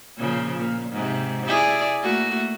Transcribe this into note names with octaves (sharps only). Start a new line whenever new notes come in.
A#2 C#3 F3
A#2
G#2 C3
E4 G#4 D5
A3 A#3 F#4